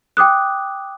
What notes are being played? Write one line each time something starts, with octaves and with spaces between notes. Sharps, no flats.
G5 D6 D#6 F#6